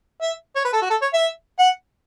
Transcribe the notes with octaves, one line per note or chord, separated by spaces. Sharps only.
E5
C#5
B4
A4
F#4
A4
C#5
E5
F#5